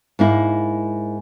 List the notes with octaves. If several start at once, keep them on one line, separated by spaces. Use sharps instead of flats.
G#2 A#3 E4